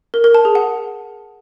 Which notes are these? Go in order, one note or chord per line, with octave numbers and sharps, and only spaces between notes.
A#4
A#4
A5
G#4
F#5